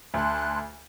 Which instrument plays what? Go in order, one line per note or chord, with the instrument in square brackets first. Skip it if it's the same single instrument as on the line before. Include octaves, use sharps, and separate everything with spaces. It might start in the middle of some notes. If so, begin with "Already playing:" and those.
[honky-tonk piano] D2 [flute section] A5 C6 F#6